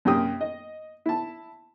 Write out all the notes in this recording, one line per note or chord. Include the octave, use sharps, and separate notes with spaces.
F#2 C3 A#3 G4 G5 D#6
D#5
E4 A5